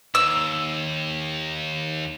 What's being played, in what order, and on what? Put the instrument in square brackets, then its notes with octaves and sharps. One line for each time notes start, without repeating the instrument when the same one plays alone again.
[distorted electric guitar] D#2 [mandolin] E6